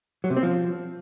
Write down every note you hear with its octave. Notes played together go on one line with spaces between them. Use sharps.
F#3
C3
C4
F3